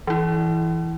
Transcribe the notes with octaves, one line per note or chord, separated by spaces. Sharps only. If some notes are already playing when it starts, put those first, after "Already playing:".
E3 E4